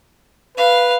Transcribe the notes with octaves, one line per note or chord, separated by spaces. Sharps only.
B4 F5